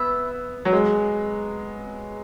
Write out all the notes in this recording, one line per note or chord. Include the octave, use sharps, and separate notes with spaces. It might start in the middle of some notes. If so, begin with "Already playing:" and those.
Already playing: B3 E4 E5
F#3
G#3